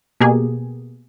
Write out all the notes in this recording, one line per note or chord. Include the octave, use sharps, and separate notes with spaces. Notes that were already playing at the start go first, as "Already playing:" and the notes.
B2 A#3 G4 G#4